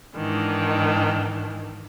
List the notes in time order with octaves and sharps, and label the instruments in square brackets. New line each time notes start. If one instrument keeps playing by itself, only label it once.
[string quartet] G#2 D#3 E3 D4